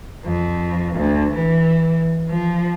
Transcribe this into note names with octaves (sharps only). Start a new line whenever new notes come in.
F2
D2
E3
F3